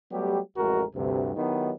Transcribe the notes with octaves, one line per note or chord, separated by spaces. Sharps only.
F#3 G3 A3 B3 G4
A1 F2 G#3 F#4 A#4
D2 G2 C3
D#3 F#3 B3 D#4 E4 G4